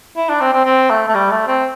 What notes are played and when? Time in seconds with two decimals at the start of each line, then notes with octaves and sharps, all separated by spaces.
0.17 E4
0.29 D4
0.41 C4
0.53 C4
0.65 C4
0.90 A3
1.08 A3
1.15 G3
1.31 A3
1.48 C4